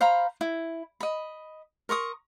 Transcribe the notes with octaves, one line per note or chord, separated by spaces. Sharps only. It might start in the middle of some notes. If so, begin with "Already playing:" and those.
C5 F5 A#5 B5
E4
D#5 B5
A#4 C6 C#6 D#6